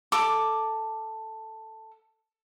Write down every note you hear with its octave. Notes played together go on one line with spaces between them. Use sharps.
A4 D6